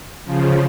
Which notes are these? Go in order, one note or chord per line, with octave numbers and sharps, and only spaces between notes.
C#3 F3